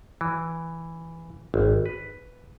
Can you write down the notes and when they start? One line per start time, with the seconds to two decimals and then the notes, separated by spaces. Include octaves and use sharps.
0.21 E3
1.54 G#1
1.86 B4